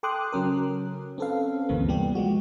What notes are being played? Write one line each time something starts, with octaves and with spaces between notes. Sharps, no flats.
A4 G5 C6 D6 D#6 F#6
C#3 F#3 C#4 A#4
C4 C#4 A4 B4 F5
D2 G2 C3 E3 A#3 C4
G3 B3 G4
F3 G#3 F#4